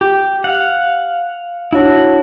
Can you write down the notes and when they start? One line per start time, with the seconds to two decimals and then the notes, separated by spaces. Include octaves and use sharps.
0.01 G4
0.44 F5 F#5
1.73 D4 E4 F#4 C#5 A5